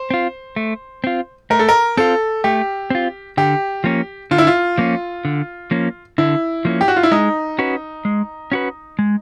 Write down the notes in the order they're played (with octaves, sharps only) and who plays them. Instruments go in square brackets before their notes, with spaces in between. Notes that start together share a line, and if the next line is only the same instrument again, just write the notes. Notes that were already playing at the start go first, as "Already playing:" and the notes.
Already playing: [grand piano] C5
[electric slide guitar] C4 F4
A3
C4 F4
[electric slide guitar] A3 [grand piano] A#4
[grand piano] A4
A#4
[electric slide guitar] C4 F4 [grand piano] A4
[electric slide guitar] A3 [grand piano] G4
[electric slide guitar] C4 F4
[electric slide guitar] D3 [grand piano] G4
[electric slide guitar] F3 A#3 C#4
[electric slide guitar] D3 [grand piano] F4
[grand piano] E4
F4
[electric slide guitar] F3 A#3 C#4
D3
F3 A#3 C#4
[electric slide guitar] D3 [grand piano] E4
[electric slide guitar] F3 A#3 C#4
[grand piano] G4
F#4
F4
E4
[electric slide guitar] G#3 [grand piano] D#4
[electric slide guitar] C#4 F#4 B4
G#3
C#4 F#4 B4
G#3